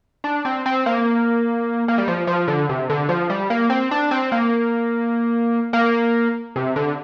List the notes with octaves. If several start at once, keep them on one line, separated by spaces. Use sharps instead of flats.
D4
C4
C4
A#3
A#3
G3
F3
F3
D3
C3
D3
F3
G3
A#3
C4
D4
C4
A#3
A#3
C3
D3